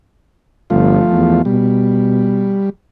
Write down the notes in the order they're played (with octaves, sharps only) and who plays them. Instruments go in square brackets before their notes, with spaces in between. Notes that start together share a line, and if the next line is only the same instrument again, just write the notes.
[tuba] G1 [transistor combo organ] F3 A3 F4
[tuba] E2
[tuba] B2 [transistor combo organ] G3